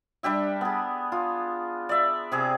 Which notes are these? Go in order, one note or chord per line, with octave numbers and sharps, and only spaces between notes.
G3 D4 G4 E5
B3 G#4
F4
D5 E5
C3 G#4 D6